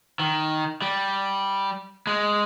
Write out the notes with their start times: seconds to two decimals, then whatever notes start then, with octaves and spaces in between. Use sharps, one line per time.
0.20 D#3
0.82 G3
2.07 G#3